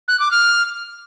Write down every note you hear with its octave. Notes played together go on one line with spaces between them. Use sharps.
F#6
D6
F6